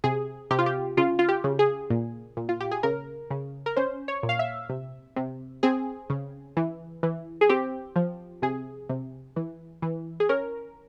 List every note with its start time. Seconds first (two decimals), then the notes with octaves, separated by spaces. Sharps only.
0.04 C3 G#4
0.51 C3 G4
0.59 F4
0.66 G4
0.97 C#3 F4
1.19 F4
1.29 G4
1.44 C#3
1.59 G#4
1.90 A#2
2.37 A#2
2.49 F4
2.60 G4
2.71 G#4
2.83 C#3 A#4
3.30 C#3
3.66 A#4
3.76 C#4 C5
4.08 C#5
4.23 A#2
4.29 F5
4.39 E5
4.69 C3
5.16 C3
5.63 C4 G#4
6.10 C#3
6.57 E3
7.03 E3
7.41 G#4
7.49 C4 G4
7.96 F3
8.42 C3 G#4
8.89 C3
9.36 E3
9.82 E3
10.20 G#4
10.29 C#4 A#4